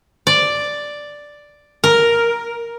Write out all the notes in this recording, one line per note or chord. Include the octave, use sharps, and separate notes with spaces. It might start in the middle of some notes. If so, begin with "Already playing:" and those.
D5
A#4